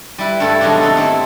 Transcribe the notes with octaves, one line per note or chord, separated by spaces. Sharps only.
G3 E4 B4
G2 A3 E4 A4
G#2 B2 D#3 F#3 D4
C3 D#4 A4
A3 C4 E4